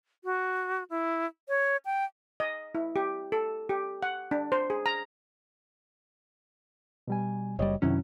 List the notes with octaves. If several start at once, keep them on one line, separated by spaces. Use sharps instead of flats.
F#4
E4
C#5
G5
D#5
E4
G4
A4
G4
F#5
D4
C5
G#4
A#5
B2 G3 G#5
F#1 G3 C#5 D#5
F#2 C3 D#3 F#3 C#4 E4